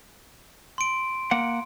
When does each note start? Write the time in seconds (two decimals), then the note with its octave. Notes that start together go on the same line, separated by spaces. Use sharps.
0.78 C6 D7
1.31 A#3 F#5